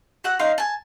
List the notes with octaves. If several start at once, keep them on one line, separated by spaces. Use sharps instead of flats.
F#4 F#5 E6
D#4 F5 C6
G#5 A5